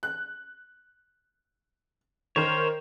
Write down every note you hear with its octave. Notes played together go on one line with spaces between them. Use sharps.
F#6
D#3 A#4 C5 C#5